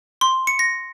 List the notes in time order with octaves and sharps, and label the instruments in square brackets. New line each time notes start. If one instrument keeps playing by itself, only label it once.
[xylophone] C6
C#7
A#6